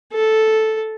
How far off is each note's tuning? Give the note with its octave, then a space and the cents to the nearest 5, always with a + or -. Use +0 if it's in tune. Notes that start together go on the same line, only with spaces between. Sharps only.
A4 -5